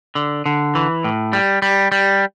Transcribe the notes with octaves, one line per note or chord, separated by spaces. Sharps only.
D3
D3
E3
A2
G3
G3
G3